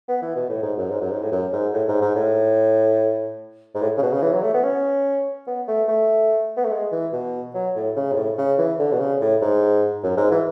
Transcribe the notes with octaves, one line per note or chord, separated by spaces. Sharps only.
B3
E3
B2
A2
G#2
F#2
G#2
F#2
G#2
A2
F#2
G#2
A2
G#2
G#2
A2
G#2
A2
C#3
B2
C#3
E3
F#3
A3
B3
C#4
B3
A3
A3
B3
A3
G#3
E3
B2
F#3
A2
C#3
G#2
A2
C#3
E3
D3
B2
C#3
A2
G#2
F#2
G#2
E3